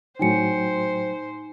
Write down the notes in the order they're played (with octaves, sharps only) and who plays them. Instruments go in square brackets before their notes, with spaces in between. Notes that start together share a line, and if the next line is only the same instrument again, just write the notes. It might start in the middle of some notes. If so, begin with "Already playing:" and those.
[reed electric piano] A2 F#3 G5 [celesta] D#4 G#5 C#7 [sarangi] C5